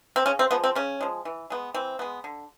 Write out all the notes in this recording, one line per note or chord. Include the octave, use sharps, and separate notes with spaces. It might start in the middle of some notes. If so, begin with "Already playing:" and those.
C4
C#3 C#4
C4
F3 G#3 B3
C4
C#3 C#4
F3 G#3
E3
G#3 B3
E3 C4
G#3 B3
D3